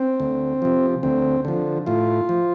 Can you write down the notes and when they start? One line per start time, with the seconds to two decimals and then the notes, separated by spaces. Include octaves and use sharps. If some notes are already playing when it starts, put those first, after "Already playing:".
Already playing: C4
0.20 D2
0.62 C3 F3
1.03 D2 C4
1.45 D3 F3
1.86 A2 F4
2.29 F3